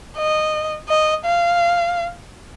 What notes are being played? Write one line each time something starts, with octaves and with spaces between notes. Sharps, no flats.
D#5
D#5
F5